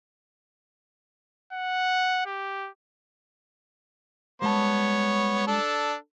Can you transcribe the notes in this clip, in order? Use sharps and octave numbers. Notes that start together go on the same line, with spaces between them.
F#5
G4
G3 G#3 B3 C#5 A5
D4 A4